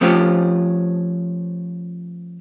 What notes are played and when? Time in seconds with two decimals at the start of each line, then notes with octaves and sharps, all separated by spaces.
0.01 F3 A3 C4 C#4 F4 G4